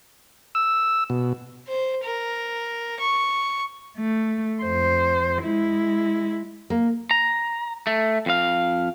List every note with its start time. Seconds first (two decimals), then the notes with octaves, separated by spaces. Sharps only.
0.55 E6
1.10 B2
1.68 C5
2.03 A#4
2.99 C#6
3.97 A3
4.62 F2 C5
5.43 G#3 E4
6.70 A#3
7.11 A#5
7.87 A3
8.26 F2 F5